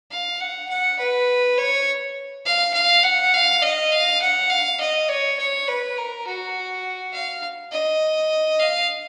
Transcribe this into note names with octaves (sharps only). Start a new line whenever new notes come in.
F5
F#5
F#5
B4
C#5
F5
F5
F#5
F5
D#5
F5
F#5
F5
D#5
C#5
C#5
B4
A#4
F#4
F5
D#5
F5